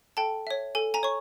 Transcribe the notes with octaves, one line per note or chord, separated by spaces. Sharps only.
A4 G5 A5
C#5 E5
A4 G#5
G#5 A#5
C#5 C#6